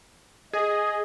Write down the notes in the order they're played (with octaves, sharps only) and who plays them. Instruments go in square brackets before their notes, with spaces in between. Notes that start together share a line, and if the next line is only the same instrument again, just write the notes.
[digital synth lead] G#4 [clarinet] D#5